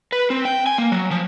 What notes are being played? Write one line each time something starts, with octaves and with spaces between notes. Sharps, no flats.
B4
C4
G5
G#5
A#3
F#3
F3